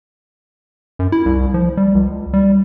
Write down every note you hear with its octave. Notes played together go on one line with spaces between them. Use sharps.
F#2
E4
C2
F3
G3
C#2
G3